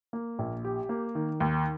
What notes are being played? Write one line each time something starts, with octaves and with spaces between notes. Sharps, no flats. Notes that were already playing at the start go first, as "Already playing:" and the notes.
A#3
A#1
G4
A#3
D#3
D#2